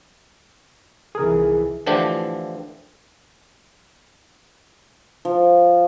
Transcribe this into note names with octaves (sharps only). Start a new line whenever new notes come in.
C2 D#3 E3 G#4 A#4
A2 D3 E3 F3 D4 G4
F3